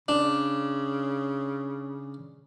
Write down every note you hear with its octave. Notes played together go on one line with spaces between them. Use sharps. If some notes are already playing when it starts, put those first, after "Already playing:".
C#3 D4